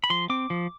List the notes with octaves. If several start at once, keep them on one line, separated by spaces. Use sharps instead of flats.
B5
F3 C6
C4 D6
F3